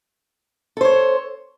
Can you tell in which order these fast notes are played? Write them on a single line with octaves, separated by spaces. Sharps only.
A4 C5 C#5